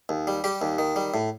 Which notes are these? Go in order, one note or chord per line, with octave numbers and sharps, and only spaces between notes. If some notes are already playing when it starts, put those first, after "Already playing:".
D#2
G3
G3 G4
D#2
D#3
G3
A2